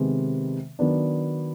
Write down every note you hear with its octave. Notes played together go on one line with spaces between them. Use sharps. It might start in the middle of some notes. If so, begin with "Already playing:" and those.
Already playing: C3 D#3 G#3 B3
D#3 F#3 B3 D4